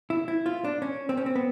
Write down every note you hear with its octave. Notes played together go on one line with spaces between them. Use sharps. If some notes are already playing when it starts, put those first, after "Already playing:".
E4
E4
F4
D4
C#4
C4
C#4
C4
B3